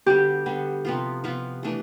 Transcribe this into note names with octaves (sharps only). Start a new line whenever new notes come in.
D3 G3 B3 G4
D3 G3 B3
C3 F3 B3 F4
C3 F3 B3 F4
E3 A3 D4 A4